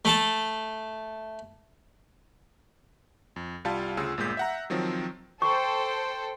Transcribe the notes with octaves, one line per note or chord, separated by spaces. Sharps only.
A3 A4 A5
F2
C2 G3 F4 F5 A5
D2 C#3 F4 G#4 E6
G1 A#2 G#3 G6 B6
E5 F#5 A#5
D#3 F3 F#3 C4
A4 C5 G5 C#6